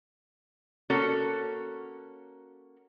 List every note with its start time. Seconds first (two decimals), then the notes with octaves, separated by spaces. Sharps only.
0.90 A#3 C#4 F#4 A4